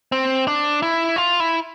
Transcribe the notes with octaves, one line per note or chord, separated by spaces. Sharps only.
C4
D4
E4
F4
E4